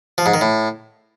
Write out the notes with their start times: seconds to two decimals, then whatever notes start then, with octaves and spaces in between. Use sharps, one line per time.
0.18 F3
0.26 G#2
0.34 D#3
0.41 A2